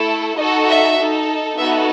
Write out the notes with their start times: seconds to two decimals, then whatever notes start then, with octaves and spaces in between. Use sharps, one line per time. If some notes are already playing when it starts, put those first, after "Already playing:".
Already playing: A3 E4 A4
0.37 D#4 F#4 A4 D#5
0.68 E5
0.98 D#4 A4
1.58 B3 D#4 F#4 A4 E5